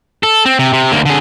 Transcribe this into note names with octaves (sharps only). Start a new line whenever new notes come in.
A4
C4
C3
C3
D2 A#3
D3 G#4